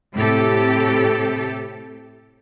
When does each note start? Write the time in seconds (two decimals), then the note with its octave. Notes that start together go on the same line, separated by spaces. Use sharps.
0.14 A2 C3 G4 A4